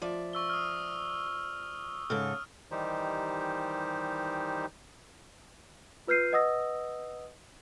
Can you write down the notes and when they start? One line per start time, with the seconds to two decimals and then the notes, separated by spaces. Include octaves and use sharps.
0.02 F3 D5 E5
0.33 C#6 E6 G7
0.50 D#6 F6
2.10 G#2 C#3 A4 F6
2.71 D#3 E3 G3 D#4 G4 C5
6.07 F4 B4 F6 G6 C7 D#7
6.32 B4 D#5 F#5 D#6 E6 A#6